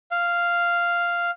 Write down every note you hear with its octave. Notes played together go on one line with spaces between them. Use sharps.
F5